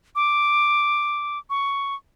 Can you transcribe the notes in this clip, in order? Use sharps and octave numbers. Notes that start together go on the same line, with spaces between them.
D6
C#6